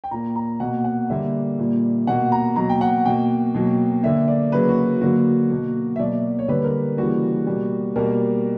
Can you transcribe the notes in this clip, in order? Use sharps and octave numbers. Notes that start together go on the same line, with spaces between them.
G5
A#2 A#3 A#5
A#5
B2 A#3 F#5
F#5
D3 G3 A#3 E5
A#2 G3 A#3
B2 A#3 F#5
A#5
B2 F#3 A#3 A#5
G5
F#5
B2 A#3 G5
B2 F#3 A#3
D3 A#3 E5
D5
C#3 F#3 A#3 B4
F#4
D3 F#3 A#3 F#4
B2 A#3
E5
B2 F#3 A#3 D5
C#5
D3 G3 A#3 B4
A#4
C#3 E3 G3 A#3 F#4
B2 G3 A#3
B2 G3 A#3 A#4